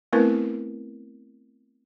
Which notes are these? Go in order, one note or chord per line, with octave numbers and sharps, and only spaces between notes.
A3 B3 C4 E4 A#4 B4